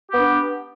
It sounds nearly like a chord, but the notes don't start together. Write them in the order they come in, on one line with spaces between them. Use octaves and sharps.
G4 B3 D4